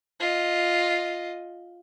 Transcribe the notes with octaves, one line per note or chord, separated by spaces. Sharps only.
F4 D#5